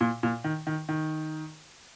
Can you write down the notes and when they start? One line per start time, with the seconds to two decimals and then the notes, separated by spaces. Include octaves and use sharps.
0.01 A#2
0.23 A#2
0.44 D#3
0.67 D#3
0.89 D#3